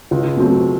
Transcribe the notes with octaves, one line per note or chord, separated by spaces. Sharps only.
C#2
B2 F#3 A3 C4